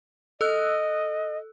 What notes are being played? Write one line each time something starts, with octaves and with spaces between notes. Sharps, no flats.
A4 D#5 E6 F#6